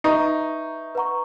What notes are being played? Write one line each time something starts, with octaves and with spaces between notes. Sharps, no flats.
D#4 B4 E5 A#5 C#6
B4 F#5 A#5 C#6